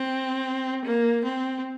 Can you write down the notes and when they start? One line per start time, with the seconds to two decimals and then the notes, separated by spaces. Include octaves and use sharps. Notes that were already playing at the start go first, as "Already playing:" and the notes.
Already playing: C4
0.85 A#3
1.25 C4